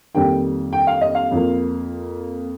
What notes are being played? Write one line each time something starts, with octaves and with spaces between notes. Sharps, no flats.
F2 D#3 G3 A#3 G5
G5
F5
D#5
F5
F2 F3 A#3